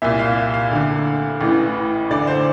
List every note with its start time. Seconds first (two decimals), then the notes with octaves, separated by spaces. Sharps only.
0.02 C2 A#2 E5
0.19 F5
0.54 F5
0.71 D2 D3
1.41 A1 A2 E3
2.10 D2 D3 D5
2.27 C5